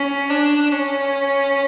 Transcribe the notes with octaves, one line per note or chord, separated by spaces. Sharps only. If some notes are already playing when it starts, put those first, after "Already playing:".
Already playing: C#4
D4
C#4